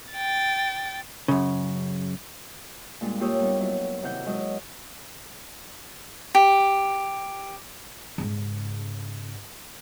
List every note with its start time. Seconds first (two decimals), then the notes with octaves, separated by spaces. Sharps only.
0.13 G5 A6
1.28 F#2 C#3
3.01 A#2 G3 G#3 D4 F4
3.21 A#3 F4 G4 C#5 D#6 E6
3.40 G3 B3 D#4
3.60 G2 F#3 E4
4.03 C3 D#3 E4 F#5 G6
4.26 F#3 G#3 E4 D#5 D#6
6.35 G4
8.18 G#2 C#3